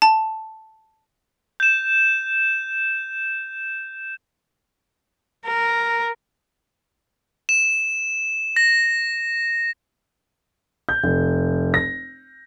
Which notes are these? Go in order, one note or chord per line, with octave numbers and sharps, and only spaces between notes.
A5
G6 E7
A#4
E7
A#6
G6
F1
A#6